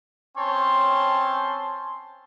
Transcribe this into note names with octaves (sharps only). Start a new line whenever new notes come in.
C4 C#4 C#5 A5 C6